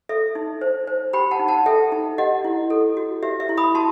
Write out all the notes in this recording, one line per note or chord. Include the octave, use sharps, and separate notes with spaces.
A4 E5
D#4
C5
C5
G4 G5 B5
F#5 A5
D#4
F#5 A5
A4 E5 G5
D#4
G4 D#5 F#5
E4
A4
F#4
G4 E5
E5
E4
B5 D#6
F#4 A5 C6